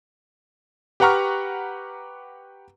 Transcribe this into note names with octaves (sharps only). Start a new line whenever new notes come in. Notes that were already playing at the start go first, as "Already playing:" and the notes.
G4 B4 F#5 A#5 C#6 F6